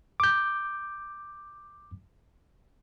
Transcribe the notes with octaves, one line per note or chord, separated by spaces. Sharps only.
D6 G6